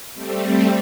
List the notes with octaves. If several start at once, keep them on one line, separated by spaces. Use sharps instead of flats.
G3 A3 C4